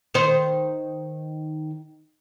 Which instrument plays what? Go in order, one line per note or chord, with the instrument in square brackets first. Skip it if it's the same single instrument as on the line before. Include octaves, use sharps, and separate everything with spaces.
[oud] D#3 C5